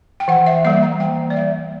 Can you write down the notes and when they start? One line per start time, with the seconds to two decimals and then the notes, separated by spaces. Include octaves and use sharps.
0.20 G5
0.28 E3 F#5
0.46 E5
0.65 G3 A#3 E5
0.82 A#5
1.00 E3 G5
1.30 D5
1.36 G3 A#3 E5